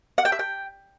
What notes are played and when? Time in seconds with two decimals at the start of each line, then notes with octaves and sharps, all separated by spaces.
0.18 F#5
0.25 G5
0.32 E5
0.39 G5